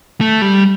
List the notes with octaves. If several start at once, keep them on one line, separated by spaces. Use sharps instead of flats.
A3
G3